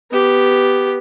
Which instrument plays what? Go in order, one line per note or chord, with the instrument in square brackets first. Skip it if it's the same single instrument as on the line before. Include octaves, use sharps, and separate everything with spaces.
[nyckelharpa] B3 G4